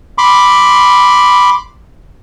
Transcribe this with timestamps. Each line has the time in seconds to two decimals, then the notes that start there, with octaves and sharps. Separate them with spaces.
0.18 B5 C6 D6